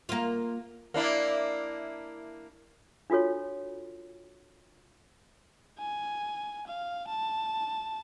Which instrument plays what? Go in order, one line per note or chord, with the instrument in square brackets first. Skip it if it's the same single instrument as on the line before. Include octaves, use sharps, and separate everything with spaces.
[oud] A#3 F4
[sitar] A#3 D4 E4
[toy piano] D4 F4 F#4 A4 C#5
[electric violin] G#5
F5
A5